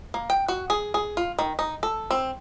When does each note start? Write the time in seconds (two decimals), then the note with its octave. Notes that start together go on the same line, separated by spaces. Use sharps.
0.14 A#3
0.30 G5
0.48 F#4
0.70 G#4
0.94 G#4
1.17 F4
1.39 D#3
1.59 D#4
1.83 A4
2.11 C4